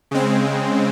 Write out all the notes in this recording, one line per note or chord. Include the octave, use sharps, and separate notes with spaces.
C#3 G#3 C4